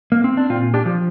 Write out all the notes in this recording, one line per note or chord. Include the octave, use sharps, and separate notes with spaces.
A#3
C4
D4
A#2 C4 F4
D4 G4
F3